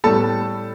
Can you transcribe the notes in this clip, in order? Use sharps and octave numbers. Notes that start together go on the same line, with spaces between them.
A2 G3 B3 A4 A5